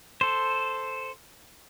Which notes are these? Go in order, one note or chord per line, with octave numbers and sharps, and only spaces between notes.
A4 C5